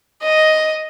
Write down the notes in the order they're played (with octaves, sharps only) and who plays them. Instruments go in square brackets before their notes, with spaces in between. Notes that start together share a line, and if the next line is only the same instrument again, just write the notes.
[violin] D#5